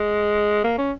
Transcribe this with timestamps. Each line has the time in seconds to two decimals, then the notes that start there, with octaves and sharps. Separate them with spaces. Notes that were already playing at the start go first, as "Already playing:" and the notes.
Already playing: G#3
0.64 A#3
0.78 C#4